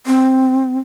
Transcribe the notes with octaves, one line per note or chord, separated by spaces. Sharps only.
C4